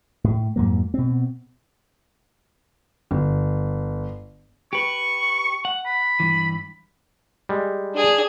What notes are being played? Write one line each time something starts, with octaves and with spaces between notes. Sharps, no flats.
A2
F2 G#2 F#3 A#3
B2 C4
G1
G4 B4 C#6
F#5
B5
G2 E3
G3 G#3
D4 G#4